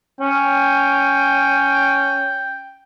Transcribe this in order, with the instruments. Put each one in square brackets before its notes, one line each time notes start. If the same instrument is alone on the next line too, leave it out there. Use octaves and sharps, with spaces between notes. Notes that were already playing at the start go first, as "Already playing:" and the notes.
[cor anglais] C#4 [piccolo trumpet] G5